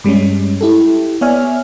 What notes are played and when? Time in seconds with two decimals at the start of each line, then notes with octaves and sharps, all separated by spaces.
0.04 G2 G3 G#3 C#4
0.61 E4 G4 A4
1.21 B3 C#5 D5 E5 G#5 F6